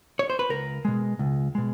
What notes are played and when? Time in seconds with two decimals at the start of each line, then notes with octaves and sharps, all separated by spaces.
0.19 C#5
0.30 C5
0.39 B4
0.49 C#2 A#4
0.85 B2 G#3
1.19 C#2
1.55 B2 G#3